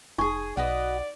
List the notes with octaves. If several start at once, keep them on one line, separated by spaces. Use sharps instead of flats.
F1 D#4 G#4 G#5 C#6
B1 F#4 B4 D5 D#5